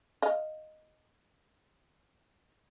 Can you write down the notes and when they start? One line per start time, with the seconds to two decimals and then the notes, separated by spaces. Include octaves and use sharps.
0.22 D#5 F5